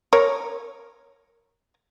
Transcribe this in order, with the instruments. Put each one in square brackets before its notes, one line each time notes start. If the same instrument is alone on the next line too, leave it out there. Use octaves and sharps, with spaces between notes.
[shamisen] A#4 C#5